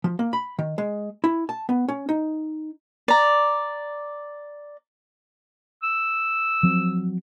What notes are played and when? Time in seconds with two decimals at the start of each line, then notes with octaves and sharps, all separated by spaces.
0.04 F3
0.19 A#3
0.33 B5
0.59 D#3
0.78 G#3
1.24 E4
1.49 A5
1.69 B3
1.88 C#4
2.09 D#4
3.08 D5 A#5
5.83 E6
6.63 F3 F#3 C4